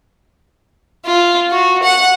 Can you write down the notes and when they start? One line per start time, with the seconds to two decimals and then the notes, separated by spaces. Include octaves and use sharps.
1.06 F4
1.51 F#4
1.83 F#5